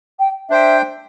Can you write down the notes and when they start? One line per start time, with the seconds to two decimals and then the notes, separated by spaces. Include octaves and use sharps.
0.19 G5
0.49 D4 C5 E5 G5